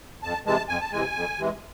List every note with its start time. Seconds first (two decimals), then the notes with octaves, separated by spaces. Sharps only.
0.23 F2 A5
0.46 C3 E3 G#3 A5
0.69 F2 G#5
0.80 A5
0.92 C3 E3 G#3 G#5
1.15 F2
1.38 C3 E3 G#3